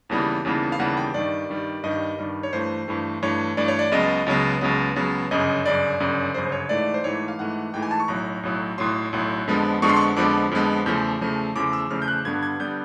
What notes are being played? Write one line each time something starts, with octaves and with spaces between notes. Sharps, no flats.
D#2 C#3 E3 G3 B3
D#2 C#3 E3 G3 B3
F5
D#2 C#3 E3 G3 B3 F#5
G5
G2 D#3 G3 D5
G2 D#3 G3
G2 D#3 G3 D#5
G2 D#3 G3
C#5
G2 E3 A3 C5
G2 E3 A3
G2 E3 A3 C#5
G2 E3 A3 D5
C#5
D5
C#2 C#3 F#3 B3 D#5
C#2 C#3 F#3 B3
C#2 C#3 F#3 B3
C#2 C#3 F#3 B3
G1 F#2 C#3 D#5
G1 F#2 C#3 D5
G1 F#2 C#3
G1 F#2 C#3 C5
C5
C#5
G#2 E3 A3 D5
C5
G#2 E3 A3 C#5
F5
G#2 E3 A3 F#5
G#2 E3 A3 G5
G#5
A5
C#6
B1 A2 F#3 A#5
B1 A2 F#3
B1 A2 F#3 C6
B1 A2 F#3
F2 D3 F3 G#3 B3
F2 D3 F3 G#3 B3 C#6
C6
C#6
F2 D3 F3 G#3 B3 D6
F2 D3 F3 G#3 B3
E2 C#3 F3 A3 G6
E2 C#3 F3 A3
E2 C#3 F3 A3 D6
E6
E2 C#3 F3 A3 F6
G6
F#6
G2 D3 G3 B3 G#6
G#6
D3 G3 B3 G6